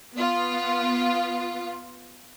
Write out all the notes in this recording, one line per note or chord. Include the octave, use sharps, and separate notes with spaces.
B3 F4